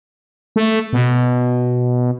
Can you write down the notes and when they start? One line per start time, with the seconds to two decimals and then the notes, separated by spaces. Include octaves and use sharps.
0.56 A3
0.93 B2